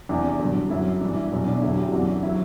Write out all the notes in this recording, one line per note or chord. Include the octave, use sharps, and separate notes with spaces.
E2 C3 E3 D4
G2 D3 F#3
F#2 F#3 E4
G2 E3 D4
E4
E2 B2 F#3 E4
D4
E2 D3 F#3 E4
E4 G4
F#2 E3 D4 F#4
F#3 E4